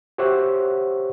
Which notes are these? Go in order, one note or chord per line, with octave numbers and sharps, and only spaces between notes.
F#4 G4 C5 C#5 E5 F#5